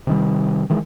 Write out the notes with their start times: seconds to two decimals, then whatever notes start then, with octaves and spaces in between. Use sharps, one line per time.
0.07 C3 D#3 G3
0.70 D#3 E3 G#3